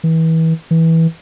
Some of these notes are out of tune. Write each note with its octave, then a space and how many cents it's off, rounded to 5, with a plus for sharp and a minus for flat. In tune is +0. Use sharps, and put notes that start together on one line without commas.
E3 -30
E3 -15